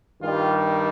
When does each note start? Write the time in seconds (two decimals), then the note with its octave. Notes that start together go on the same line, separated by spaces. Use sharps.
0.20 G2 D#3 G3 F4